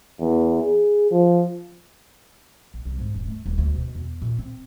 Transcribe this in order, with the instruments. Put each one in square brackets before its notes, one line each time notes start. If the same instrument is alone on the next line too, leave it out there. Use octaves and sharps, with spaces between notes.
[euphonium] E2
G#4
F3
[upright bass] A#1
C2
G#2
D#1
A3
D#1
D2
B2
E2
A#2
C4